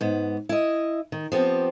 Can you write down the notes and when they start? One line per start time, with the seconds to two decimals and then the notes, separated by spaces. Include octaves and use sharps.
0.01 G#2 B3
0.49 E4 D#5
1.12 D#3
1.32 F3 B3 C4 G4